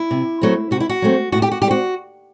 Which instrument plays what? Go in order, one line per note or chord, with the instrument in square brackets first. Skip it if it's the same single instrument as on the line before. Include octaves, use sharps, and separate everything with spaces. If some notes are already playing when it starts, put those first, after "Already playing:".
Already playing: [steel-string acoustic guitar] E4
C3
F#3 A3 C4
C3 F#4
E4
F#4
F#3 A3 C4
A2 F#4
G4
F#4
G3 G4
C4 F#4